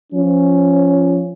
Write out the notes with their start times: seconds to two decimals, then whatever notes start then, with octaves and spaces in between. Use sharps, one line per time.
0.11 F3 C#4